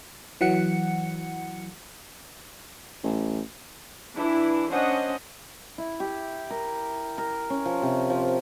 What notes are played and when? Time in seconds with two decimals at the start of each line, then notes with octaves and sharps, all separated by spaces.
0.41 E3 F#3 F#5 C#7
3.03 A1
4.15 E3 D4 E4
4.71 C#4 D4 C5 D#5 F#5
5.78 E4
6.00 G4
6.50 A#4
7.18 A#4
7.50 C#4
7.65 F3
7.82 C3
8.10 F3